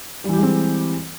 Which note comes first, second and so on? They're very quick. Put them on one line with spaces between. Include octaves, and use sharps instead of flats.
G3 E3 G4 G#3 C4